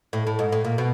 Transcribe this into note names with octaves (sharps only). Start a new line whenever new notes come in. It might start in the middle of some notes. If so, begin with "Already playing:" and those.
A2
A2
G#2
A2
A#2
B2